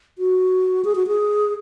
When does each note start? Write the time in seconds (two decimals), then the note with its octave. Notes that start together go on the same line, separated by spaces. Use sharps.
0.18 F#4
0.85 G#4
0.95 F#4
1.07 G#4